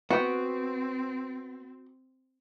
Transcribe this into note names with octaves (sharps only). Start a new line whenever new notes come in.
B3 C4 F#4 G5